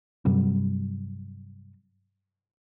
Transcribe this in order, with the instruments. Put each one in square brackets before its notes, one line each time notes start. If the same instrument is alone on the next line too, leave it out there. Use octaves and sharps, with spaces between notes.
[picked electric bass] G2 C3 F#3 G3